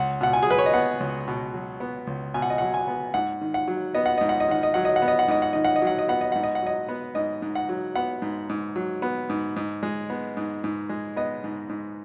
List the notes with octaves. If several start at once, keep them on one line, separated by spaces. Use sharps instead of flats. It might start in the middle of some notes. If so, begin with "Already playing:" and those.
Already playing: C#2 F#5
B2 F#5
G#5
G#4
F#3 B4
C#5
D#5
B3 F#5
C#2
B2
F#3
B3
C#2
B2 G#5
F#5
D#5
F#5
F#3
G#5
B3
G#2 F#5
D#3
F#5
F#3
B3 D#5
F#5
G#2 D#5
F#5
D#5
D#3 F#5
D#5
F#3 F#5
D#5
F#5
B3
D#5
F#5
G#2 D#5
F#5
D#3 D#5
F#5
D#5
F#3
F#5
D#5
B3 F#5
D#5
G#2 F#5
D#5
F#5
F#3 D#5
B3
G#2 D#5
G#2
F#5
F#3
B3 F#5
G#2
G#2
F#3
B3
G#2
G#2
G#3
B3
G#2
G#2
G#3
B3 D#5
G#2
G#2